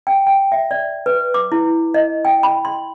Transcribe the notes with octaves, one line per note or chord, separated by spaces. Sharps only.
G5
G5
E5
D5
B4
D6
E4
D#5
G5
B5
C6